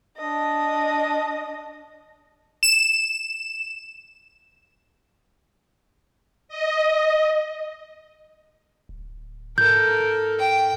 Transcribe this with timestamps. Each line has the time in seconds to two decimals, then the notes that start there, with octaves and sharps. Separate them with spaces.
0.17 D4 D#5
2.63 E7
6.49 D#5
8.89 D1
9.58 G#2 A4 A#4 G6
10.39 G5